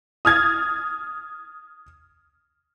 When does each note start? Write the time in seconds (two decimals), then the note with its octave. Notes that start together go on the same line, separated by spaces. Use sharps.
0.25 D#6 F6 G#6 A6